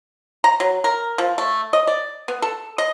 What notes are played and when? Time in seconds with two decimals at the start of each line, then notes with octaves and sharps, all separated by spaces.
0.44 A#5
0.60 F#3
0.84 A#4
1.18 F3
1.38 A3
1.73 D#5
1.87 D5
2.28 B3
2.42 A4
2.78 D#5